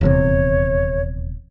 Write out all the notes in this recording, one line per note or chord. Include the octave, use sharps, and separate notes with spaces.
D#1 E2 C3 C#5